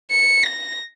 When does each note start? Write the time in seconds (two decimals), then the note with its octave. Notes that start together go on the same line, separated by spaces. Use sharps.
0.11 C#7
0.43 A#6